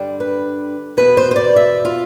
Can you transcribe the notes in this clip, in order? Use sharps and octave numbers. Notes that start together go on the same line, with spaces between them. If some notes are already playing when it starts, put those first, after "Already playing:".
Already playing: G2 D3 G3 D4
B4
E2 B2 B3 B4
C5
C5
D5
E5
F4